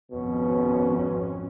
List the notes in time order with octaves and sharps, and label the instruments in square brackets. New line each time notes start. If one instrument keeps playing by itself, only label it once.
[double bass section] G#1 F2 C#4 [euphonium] B2